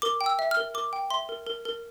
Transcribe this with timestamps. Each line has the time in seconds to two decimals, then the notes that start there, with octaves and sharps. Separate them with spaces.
0.02 A#4 D6
0.21 G5
0.26 E6
0.39 E5
0.51 F6
0.57 A#4
0.75 A#4 D6
0.93 G5
1.10 E5 C6
1.29 A#4
1.47 A#4
1.65 A#4